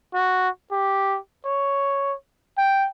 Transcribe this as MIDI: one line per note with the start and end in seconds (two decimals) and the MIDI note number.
0.14 0.49 66
0.72 1.18 67
1.45 2.14 73
2.58 2.88 79